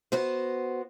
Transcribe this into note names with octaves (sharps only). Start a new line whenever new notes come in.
B3 F#4 C5